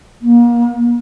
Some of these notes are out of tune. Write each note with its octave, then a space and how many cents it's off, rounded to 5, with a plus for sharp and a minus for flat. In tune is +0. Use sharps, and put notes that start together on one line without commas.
A#3 +35